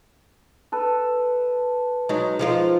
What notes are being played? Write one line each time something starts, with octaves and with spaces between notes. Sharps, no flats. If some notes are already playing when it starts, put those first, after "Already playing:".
A4 B4
F#3 G#3 D#4
F3 G#3 F4